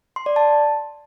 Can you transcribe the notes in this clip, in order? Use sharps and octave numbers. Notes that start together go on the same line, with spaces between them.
C6
D5
A5